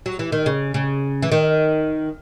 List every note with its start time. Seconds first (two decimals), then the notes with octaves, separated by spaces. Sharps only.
0.06 F#3
0.19 E3
0.32 D#3
0.46 C#3
0.74 C#3
1.22 E3
1.32 D#3